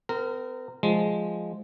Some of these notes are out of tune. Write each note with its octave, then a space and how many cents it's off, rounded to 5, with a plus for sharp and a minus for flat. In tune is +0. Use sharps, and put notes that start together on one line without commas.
C4 -45 A#4 -20
F3 +0 G#3 +0